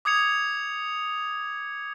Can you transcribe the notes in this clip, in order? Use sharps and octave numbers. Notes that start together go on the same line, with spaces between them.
D6 D#6 G#6 C#7 F7